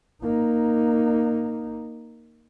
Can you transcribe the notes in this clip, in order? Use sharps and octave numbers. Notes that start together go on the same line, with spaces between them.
A#3 D#4